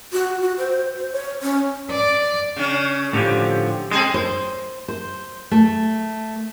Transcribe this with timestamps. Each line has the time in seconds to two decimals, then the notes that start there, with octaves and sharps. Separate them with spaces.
0.12 F#4
0.41 F#4
0.58 C5
0.97 C5
1.12 C#5
1.42 C#4
1.91 D5
2.56 C#3 C#4
3.13 A2 D3 F3 G4
3.91 G#3 C4 G#4 A4
4.14 C5
4.88 C5
5.51 A3